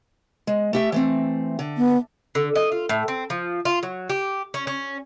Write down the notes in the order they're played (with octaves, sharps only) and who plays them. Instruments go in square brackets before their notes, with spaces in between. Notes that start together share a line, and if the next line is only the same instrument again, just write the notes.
[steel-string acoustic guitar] G#3
A3 G4 E5
E3 A3 C4
D3
[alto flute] B3
[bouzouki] D3
D#5
F4
A2
C4
F3
F4
F#3
G4
C#4
C#4